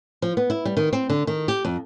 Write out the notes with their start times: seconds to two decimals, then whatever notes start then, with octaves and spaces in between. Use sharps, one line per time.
0.22 F3
0.37 B3
0.50 E4
0.65 G3
0.77 D#3
0.93 C4
1.10 D3
1.27 D#3
1.48 G4
1.65 F2